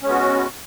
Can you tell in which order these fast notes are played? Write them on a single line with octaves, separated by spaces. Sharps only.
C#4 G#3 B3 F#4